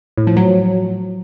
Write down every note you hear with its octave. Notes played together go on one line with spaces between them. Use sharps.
A2
F3
F#3